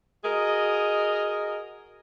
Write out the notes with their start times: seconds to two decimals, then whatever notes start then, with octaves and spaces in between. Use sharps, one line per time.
0.24 F#4 G#4 A#4 D#5